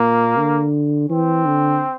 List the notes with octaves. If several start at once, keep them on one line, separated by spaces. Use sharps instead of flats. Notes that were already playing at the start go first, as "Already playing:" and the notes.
Already playing: A#2 A#3
D3
E3 C4
D3